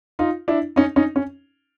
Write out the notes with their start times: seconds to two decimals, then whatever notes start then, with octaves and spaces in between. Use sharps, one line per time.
0.19 D#4 F4
0.48 D4 E4
0.76 C#4 D#4
0.96 C#4 D#4
1.16 C#4